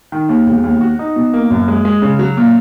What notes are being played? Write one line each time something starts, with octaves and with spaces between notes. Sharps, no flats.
D#3
D#2
E1
D#2
F#4
D#4
B2
A#3
F#2
G#3
G#3
C#3
F#3
A#2